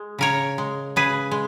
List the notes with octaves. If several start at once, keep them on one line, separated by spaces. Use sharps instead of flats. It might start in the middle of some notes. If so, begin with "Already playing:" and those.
Already playing: G#3
C#3 A#4 C#5
G#3
C#3 G#4 B4
G#3